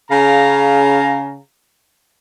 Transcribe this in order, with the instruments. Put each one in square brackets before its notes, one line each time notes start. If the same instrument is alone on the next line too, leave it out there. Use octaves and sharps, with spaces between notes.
[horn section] C#3 F5 A#5